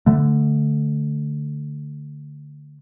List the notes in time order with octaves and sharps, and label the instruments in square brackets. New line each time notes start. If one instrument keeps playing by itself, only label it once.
[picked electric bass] D3 A3